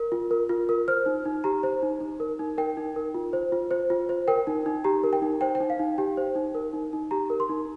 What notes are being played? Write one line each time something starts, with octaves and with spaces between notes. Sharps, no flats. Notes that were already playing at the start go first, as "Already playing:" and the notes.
Already playing: A#4
F4
A#4
F4
A#4
C5 F6
D#4
D#4
G4 A#5
C5
D#4
D#4
A#4
D#4
A#4 G5
D#4
A#4
F4
C5
F4
C5
F4
C5
A#4 G5
D#4
D#4
G4 A#5
A#4
G5
D#4
C5 G5
G5
D#4
F5
D#4
G4 G5
C5
D#4
A#4
D#4
D#4
G4 A#5
A#4
C6
D#4